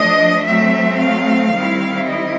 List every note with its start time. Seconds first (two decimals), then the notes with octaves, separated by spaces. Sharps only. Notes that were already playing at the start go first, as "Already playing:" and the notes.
Already playing: F3 A3 D4 D#5
0.46 F#3 A3 C4 E5
1.01 F5
1.54 D#3 G3 C4 E4
2.08 D#5